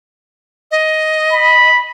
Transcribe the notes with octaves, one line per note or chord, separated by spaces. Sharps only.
D#5
B5